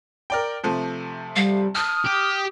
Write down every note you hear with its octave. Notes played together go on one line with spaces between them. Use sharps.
A#4 D5 G5
C3 F3 A3
G3 F5
A5 D#6 F6
G4